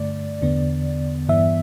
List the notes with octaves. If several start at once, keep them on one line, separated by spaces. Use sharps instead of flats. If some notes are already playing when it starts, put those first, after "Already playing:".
Already playing: G2 D3 A3 D5
E2 D3 B3
G2 E3 B3 E5